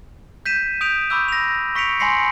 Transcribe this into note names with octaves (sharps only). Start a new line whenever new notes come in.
G6 B6 D#7 E7
D#6 G6 D7 F7
B5 C#6 D6 E6 G6
A#6 F7
C#6 B6 C#7 D7 F7
G#5 B5 C6 A#6 C7 C#7